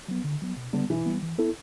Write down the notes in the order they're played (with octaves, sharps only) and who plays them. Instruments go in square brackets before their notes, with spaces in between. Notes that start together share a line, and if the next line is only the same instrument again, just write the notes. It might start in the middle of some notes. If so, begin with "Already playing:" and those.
[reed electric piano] F#3 B3
D3
F#3 B3
B2
[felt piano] D3 [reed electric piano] G3 B3
[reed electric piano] B2 [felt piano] E3
[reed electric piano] G3 B3
E3
B3 E4 A4